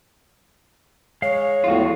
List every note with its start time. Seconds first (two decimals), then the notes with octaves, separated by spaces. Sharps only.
1.22 G#3 C#5 F5
1.64 E2 A2 F3 F4 F#4